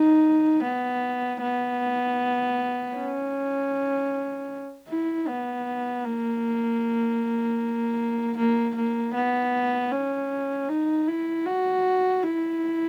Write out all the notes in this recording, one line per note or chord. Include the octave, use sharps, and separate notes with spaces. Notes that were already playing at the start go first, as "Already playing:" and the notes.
Already playing: D#4
B3
B3
C#4
E4
B3
A#3
A#3
A#3
B3
C#4
D#4
E4
F#4
E4